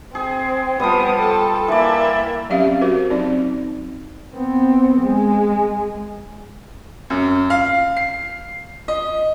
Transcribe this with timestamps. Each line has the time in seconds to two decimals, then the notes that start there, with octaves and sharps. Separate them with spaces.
0.15 C4 G#4
0.80 F3 G3 B3 D#6
1.17 A4 G5
1.68 E3 A#3 D5 E5
2.50 F#3 C4 C#4 G4 E5 F5
2.81 F#4 A#4 C5
3.10 F#3 C4 D#4 D5
4.35 B3 C4
5.02 G#3
7.10 F#2
7.50 F5
7.97 C7
8.88 D#5